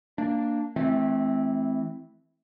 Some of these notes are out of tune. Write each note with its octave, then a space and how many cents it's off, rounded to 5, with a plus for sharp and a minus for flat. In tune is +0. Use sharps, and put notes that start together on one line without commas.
A#3 -10 D4 +0
E3 +0 A3 -30 C4 +5